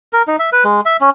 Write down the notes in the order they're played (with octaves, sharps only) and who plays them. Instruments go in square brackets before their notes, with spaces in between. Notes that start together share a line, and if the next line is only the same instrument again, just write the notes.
[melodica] A#4
D#4
E5
B4
G#3
E5
C#4